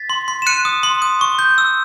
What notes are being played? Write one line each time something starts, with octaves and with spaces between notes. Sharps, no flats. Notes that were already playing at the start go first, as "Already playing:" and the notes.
Already playing: A6 B6
C6
C6
E7
F#6 C#7 D#7
D#6
C6
D#6
C#6
G6
E6